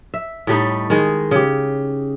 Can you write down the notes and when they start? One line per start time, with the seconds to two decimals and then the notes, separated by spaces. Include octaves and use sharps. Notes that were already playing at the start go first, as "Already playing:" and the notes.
0.14 E5
0.47 A2 G3 A3 D#4
0.90 D#3 G#3
1.31 C#3 G4